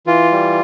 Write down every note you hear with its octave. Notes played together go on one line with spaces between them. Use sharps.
E3 F4
G3